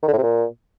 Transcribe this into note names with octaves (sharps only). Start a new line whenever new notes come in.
D#3
D3
A2
C3
A#2